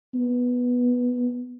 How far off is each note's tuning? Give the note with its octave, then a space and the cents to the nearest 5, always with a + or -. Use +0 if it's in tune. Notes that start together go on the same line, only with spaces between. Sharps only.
B3 -5